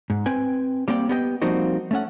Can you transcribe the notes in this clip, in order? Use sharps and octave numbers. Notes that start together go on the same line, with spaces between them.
G#2
C4 B4 G5 G#5
G3 A#3 C4 D5 G5
B3 G4 B4 D#5 G5
F3 G3 A#3 C4 D#4 F#4
A3 C#4 F#5